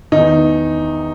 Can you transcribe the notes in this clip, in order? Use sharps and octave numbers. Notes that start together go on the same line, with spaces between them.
E2 D#3 D#4